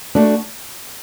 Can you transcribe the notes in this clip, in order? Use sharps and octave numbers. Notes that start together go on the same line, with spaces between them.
A3 D4 F#4